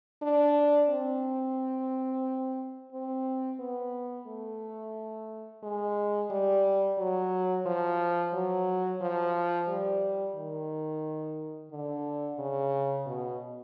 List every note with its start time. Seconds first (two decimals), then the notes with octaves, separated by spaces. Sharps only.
0.22 D4
0.89 C4
2.93 C4
3.59 B3
4.27 A3
5.63 G#3
6.30 G3
6.98 F#3
7.66 F3
8.33 F#3
9.01 F3
9.68 G3
10.36 D#3
11.71 D3
12.39 C#3
13.06 B2